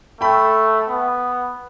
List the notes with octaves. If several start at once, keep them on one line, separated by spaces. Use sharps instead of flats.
A3 G5 B5
B3